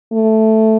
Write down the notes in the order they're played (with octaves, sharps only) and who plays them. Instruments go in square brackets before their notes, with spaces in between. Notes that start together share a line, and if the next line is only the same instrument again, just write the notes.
[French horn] A3